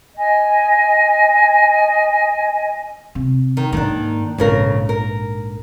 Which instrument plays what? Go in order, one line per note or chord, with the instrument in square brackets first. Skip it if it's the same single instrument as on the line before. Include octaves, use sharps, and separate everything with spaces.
[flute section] D#5 G#5
[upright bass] C3
[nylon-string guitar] D#3
[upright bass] G#2 A#3 [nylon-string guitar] D#3 D4
[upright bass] A#1 G#2 [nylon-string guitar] F2 C#3 A#4
[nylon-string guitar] A#4